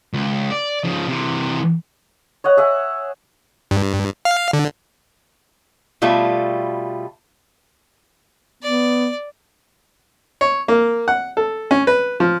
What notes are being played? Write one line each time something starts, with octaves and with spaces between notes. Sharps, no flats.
C#2
D5
C#3 F3
C3 E3
C#5 D#5 F#5
G#4 E5 F#5 G#5
G2
F5
D3
B2 G3 A3 F4 A4
B3 D5
C#5
A#3
F#5
A4
C#4
B4
F3